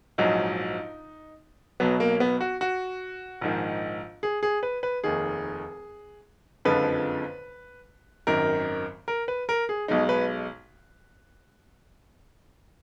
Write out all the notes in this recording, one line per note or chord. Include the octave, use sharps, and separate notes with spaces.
A#1 G#2 F#3 D#4
B1 B2 F#3 B3
A#3
B3
F#4
F#4
A#1 G#2 D#3
G#4
G#4
B4
B4
F1 D#2 D#3 G#4
F#1 F2 D3 F3 G#3 B4
G#1 F#2 D#3 A#4
A#4
B4
A#4
G#4
B1 B2 G#3 D#4
B4